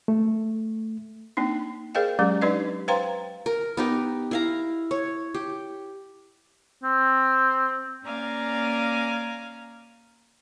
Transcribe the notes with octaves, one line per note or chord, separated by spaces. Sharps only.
A3
A#3 C4 D4 D#4
G#4 A#4 C5 D#5 F5 G5
F#3 G#3 C#4 G4
D4 D#4 G4 B4 D5 D#5
B4 C5 F5 G5 A#5 C6
A#4
B3 D#4 G4
E4 F5 A#5
C#5
G4
C4
A#3 C#4 D5 F5 G#5 A#5